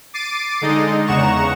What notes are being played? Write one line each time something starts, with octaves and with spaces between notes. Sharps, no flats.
D6 A6 C7 D7 D#7
D3 G#3 D#4 D#5
E2 C#3 F#5 A#5 C#6 E7